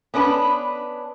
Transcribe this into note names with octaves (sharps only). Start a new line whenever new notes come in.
B3 C#4 D4 B4